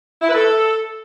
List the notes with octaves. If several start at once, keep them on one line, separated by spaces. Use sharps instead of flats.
E4
B4
A4